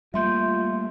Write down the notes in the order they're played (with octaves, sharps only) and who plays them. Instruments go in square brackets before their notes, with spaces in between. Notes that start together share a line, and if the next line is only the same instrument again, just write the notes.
[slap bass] G3 A3 A#3 [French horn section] F4 [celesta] E5 C6 G6